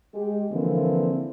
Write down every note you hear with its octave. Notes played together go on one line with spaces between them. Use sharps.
G#3 G4
D3 E3 F3 A#3 C4